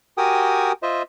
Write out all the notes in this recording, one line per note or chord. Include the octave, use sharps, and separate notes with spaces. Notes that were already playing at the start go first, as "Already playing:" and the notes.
F#4 G4 A#4 G5 G#5 D#6
F4 C5 D#5 E5